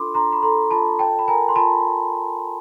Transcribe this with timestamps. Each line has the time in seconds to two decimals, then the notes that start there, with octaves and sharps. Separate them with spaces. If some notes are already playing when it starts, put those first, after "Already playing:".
Already playing: D4 F4 A4 B5 C6 D6
0.14 D4 A#5 C6
0.32 B5
0.42 A4 A#5 C6
0.71 F4 A5 B5
0.99 C#5 G5 A5
1.19 B5
1.28 A#4 G#5 A#5
1.49 C6
1.56 F4 A5 B5